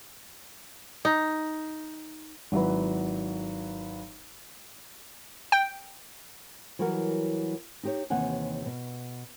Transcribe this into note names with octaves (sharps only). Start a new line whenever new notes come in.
D#4
G#1 F#3 E4 B4
G5
E3 F#3 G3 F#4 A#4
D#4 G4 C#5
D#2 C3 E3 C#5 F#5 G#5
B2